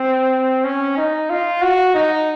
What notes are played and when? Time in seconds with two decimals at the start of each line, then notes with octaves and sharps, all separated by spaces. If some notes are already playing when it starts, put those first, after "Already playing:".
Already playing: C4
0.64 C#4
0.97 D#4
1.30 F4
1.62 F#4
1.95 D#4